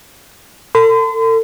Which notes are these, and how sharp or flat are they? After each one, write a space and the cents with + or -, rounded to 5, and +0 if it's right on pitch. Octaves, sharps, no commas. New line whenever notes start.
A4 +40 C6 -45